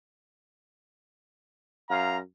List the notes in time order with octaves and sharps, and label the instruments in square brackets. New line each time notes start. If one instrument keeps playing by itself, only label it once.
[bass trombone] F#2 [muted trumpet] F5 [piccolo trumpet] A#5